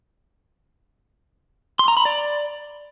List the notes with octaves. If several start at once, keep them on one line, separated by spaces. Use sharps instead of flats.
C6
A#5
B5
D5